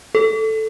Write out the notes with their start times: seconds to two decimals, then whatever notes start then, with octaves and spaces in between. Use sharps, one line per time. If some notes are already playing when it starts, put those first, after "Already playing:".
0.15 A4